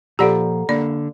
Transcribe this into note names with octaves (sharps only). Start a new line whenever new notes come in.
A#2 F3 G4 A4 D5 F#5 A#5 B5
D3 A#3 D5 B5